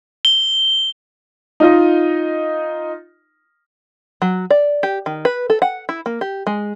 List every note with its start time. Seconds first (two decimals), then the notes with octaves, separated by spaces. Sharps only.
0.25 G7
1.60 D#4 F4 D#5
4.22 F#3
4.50 D5
4.83 G4
5.06 D#3
5.25 B4
5.50 A4
5.62 F#5
5.89 E4
6.06 A#3
6.21 G4
6.47 G#3